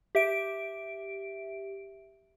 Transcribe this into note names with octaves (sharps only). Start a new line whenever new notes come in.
G4 E5 D7